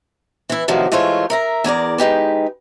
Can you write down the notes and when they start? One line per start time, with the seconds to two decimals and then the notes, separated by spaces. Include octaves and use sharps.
0.50 E3 E4
0.68 A2 C3 D#3 F3 F#3
0.92 E3 G#3 A3 F4 C5 C#5
1.30 A#4 E5 A#5
1.64 E2 G#4 A#4 D5
1.98 G#3 D#4 G4 B4